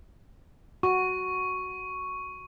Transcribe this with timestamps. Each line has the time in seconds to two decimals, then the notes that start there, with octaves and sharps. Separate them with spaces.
0.83 F#4 C#6